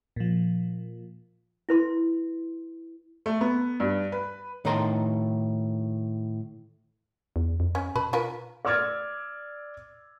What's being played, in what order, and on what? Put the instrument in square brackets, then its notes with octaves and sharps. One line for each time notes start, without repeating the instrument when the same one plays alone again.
[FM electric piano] A#2 F3
[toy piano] E4 B4 C6
[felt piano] A3
B3
G2
B4
[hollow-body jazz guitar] A2 D#3 D#4 A4 A#5 C6
[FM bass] E2
F2
[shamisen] C#4
[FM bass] B2 [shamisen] B4 A5 B5
[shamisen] F4 A#4 B4
[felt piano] D5 D6 E6 F6 G#6 A6